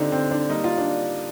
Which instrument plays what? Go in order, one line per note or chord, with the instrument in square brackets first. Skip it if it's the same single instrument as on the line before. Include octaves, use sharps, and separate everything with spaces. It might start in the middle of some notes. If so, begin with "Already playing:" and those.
Already playing: [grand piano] D3 G3 [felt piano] C4 D4 D#4 F4
[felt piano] C4
D4
[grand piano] G3 A#3 D#4
[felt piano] F4
D4